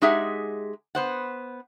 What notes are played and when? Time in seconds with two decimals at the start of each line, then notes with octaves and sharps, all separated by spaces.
0.02 G#3 D#4 G4 G#4 E5 F#5
0.95 B3 C5 F#5